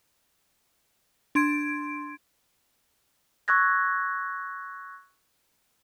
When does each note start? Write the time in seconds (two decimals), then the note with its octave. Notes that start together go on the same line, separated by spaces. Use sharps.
1.35 D4 C6 G#6 D7
3.48 C#6 E6 F#6 G#6 A#6